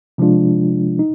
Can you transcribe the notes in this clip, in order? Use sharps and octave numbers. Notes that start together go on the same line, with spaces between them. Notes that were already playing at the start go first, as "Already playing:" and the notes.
C3 F3 G#3 D4 F4
D#4